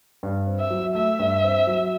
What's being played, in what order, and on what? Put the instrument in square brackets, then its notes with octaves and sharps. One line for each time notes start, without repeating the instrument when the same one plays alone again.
[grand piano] G2
C4
[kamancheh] E5
[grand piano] F#3
[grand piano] A3 [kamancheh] E5
[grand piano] G2
C4
F#3